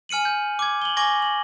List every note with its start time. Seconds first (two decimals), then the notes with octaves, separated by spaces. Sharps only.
0.09 G#5 F6 C#7 D#7 F#7
0.25 G6
0.59 D6 G#6
0.82 F#7 G7
0.97 G#5 C#6 D6 G#6 A#6 G7
1.22 F#7